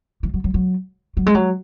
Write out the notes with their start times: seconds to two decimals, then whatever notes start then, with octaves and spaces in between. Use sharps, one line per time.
0.23 E3
0.34 F#3
0.44 F#3
0.54 F#3
1.17 F#3
1.26 G#3
1.35 F#3